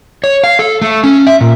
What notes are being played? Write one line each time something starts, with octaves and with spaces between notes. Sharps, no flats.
C#5
F5
A4
A3
C#4
E5
A#2